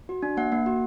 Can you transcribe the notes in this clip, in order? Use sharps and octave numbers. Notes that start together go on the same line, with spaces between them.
F#4
D4
A#3 F#5
A#3
F#4